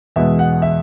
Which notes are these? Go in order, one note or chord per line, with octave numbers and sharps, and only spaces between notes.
E2 B2 G#3 E5
F#5
E5